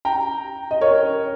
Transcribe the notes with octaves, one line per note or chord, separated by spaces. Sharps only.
G5 A#5
D#5
A#4 C#5